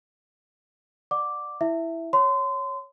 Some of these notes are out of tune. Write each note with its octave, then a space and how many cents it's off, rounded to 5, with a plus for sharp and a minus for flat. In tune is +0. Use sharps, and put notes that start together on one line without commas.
D5 +25 F#5 -15 D6 +0
E4 +0 E5 +5
C#5 +0 C6 -30